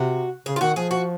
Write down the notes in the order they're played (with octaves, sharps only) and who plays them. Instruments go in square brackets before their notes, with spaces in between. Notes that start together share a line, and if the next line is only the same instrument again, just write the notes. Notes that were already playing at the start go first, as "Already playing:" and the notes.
Already playing: [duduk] C3 [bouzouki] F#4
[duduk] C#3 [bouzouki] G#4
[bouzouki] F4
[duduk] D#3 [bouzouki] F#4
[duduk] F3 [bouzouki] G#4
[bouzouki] F#4